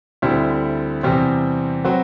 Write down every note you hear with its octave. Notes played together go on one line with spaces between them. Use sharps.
D2 D3 G3 C4 E4
E2 C3 G3 C4
F#3 C4 F#4 B4